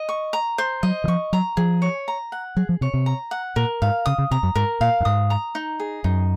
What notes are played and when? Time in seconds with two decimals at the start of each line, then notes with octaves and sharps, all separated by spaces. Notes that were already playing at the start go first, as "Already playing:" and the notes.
Already playing: D#5
0.09 C#6
0.33 A#5
0.58 C5
0.83 F#3 D#5
1.04 D#3
1.08 F3 C#6
1.33 F#3 A#5
1.57 F3 G#4
1.82 C#5
2.08 A#5
2.32 F#5
2.57 F#3 G#4
2.69 F3
2.81 C3 C#5
2.94 C3
3.06 A#5
3.31 F#5
3.56 A#2 A#4
3.82 G#2 F5
4.06 C#3 D#6
4.18 C#3
4.31 C3 A#5
4.43 F#2
4.55 G#2 A#4
4.81 A#2 F5
5.00 F#2
5.05 G#2 D#6
5.30 A#5
5.55 D#4
5.80 G#4
6.04 F#2 D#4